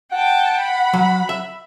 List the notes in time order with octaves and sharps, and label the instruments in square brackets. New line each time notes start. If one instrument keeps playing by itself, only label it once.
[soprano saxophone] F#5 [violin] G5 A5
[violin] B5
[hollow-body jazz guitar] F#3
E5